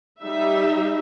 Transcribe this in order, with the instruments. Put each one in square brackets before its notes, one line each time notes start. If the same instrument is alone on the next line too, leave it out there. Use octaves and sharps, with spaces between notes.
[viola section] G3 D#4 E5